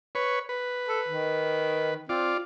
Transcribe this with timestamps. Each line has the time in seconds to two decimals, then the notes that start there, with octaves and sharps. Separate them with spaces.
0.15 B4 C#5
0.49 B4
0.88 A4
1.09 D#3
2.09 C4 F4 D5